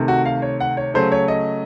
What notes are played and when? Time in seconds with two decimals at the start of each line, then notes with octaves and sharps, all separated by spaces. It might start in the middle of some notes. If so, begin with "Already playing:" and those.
Already playing: C3 D#3 A3
0.08 F#4
0.26 F5
0.42 C#5
0.60 F#5
0.77 C#5
0.94 C#3 F#3 A3 C5
1.12 C#5
1.28 D#5